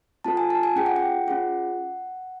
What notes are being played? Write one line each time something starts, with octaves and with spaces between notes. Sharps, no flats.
C4 F4 A4 A5
G#5
A5
G#5
C#4 F4 G#4 G5
F#5
G5
C#4 F4 G#4 F#5